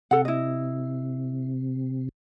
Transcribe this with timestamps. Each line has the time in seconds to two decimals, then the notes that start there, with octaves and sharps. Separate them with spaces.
0.11 C3 A4 F#5
0.25 E4 D#5